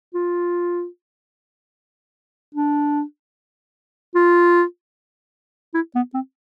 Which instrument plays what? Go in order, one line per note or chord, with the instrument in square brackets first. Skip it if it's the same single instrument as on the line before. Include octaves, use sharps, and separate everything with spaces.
[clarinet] F4
D4
F4
E4
B3
C4